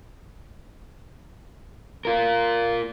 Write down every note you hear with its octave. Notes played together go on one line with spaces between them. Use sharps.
F4 A#4